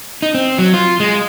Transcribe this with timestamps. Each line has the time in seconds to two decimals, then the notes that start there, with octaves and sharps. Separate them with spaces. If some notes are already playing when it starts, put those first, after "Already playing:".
0.22 D#4
0.34 C4
0.58 F#3
0.74 F4
1.00 G#3